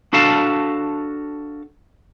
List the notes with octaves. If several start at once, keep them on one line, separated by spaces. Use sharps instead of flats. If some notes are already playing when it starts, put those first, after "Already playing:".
D4 F#4 A4 F5 A5